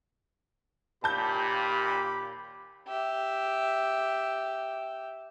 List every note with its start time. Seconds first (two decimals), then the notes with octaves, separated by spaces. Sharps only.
1.04 D#2 A#2 G4 A5 B5 G6
2.87 G4 E5